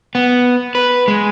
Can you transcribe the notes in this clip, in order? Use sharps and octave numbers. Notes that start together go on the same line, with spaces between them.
B3
B4
G#3